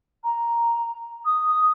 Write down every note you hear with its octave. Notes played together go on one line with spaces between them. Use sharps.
A#5
D#6